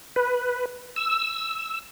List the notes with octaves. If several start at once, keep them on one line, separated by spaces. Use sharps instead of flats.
B4
E6